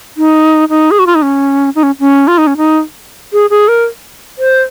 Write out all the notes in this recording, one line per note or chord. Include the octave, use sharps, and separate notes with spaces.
D#4
D#4
G#4
F#4
F4
D#4
C#4
D#4
C#4
C#4
F4
D#4
C#4
D#4
G#4
G#4
A#4
C5